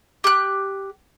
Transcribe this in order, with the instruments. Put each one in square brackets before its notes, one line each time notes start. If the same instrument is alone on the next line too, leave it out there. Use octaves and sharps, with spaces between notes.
[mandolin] G4 F#6